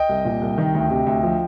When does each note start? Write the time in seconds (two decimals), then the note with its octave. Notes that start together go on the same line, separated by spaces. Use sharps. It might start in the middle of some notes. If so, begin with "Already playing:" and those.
Already playing: D#5 G5
0.09 C2
0.25 A#2
0.42 C2
0.58 D#3
0.75 D2
0.90 C3
1.06 D2
1.23 F3